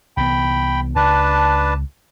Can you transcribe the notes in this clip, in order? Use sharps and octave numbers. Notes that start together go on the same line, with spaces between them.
C2 E3 B3 G5 B5
C#2 D4 B4 A5